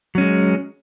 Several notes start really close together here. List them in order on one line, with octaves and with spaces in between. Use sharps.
F#3 C#4 G#3